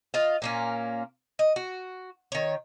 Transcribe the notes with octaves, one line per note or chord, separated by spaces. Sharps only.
F4 D#5 F5
A#2 A#3 C#4
D#5
F#4
D#3 C#5